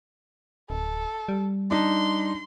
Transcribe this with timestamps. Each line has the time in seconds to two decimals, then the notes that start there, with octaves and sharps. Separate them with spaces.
0.70 D1 A4
1.28 G3
1.71 D4 D#4 C6